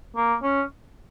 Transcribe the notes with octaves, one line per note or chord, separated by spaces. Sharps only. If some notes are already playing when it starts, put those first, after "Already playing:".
A#3
C#4